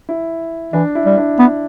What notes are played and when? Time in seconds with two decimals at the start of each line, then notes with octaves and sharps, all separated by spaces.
0.09 E4
0.73 E3 D4
0.95 E4
1.06 G3
1.17 D4
1.39 B3